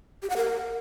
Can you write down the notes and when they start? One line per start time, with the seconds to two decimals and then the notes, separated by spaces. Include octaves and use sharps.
0.22 G4
0.30 F#5
0.37 A#4